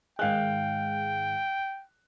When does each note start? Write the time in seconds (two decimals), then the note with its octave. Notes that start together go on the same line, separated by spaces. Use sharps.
0.19 G#2 D#3 G#3 F5 G5 F#6